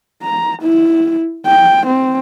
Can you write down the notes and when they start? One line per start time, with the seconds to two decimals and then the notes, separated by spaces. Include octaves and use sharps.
0.22 A#5
0.62 E4
1.46 G5
1.87 C4